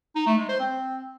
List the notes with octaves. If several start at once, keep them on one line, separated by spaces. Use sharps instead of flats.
D#4
A3
G#3
C5
C4